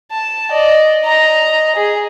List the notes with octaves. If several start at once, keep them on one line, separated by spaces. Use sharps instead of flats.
A5
D5 D#5
D#5 A#5
G#4